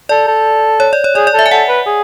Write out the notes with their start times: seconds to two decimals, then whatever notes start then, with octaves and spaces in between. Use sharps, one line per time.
0.09 A4 D5
0.28 A4
0.80 C#5
0.93 D5
1.04 C#5
1.15 G#4 D5
1.27 D5
1.34 A4
1.39 E5
1.46 G#5
1.51 A4 F#5
1.68 B4
1.86 G#4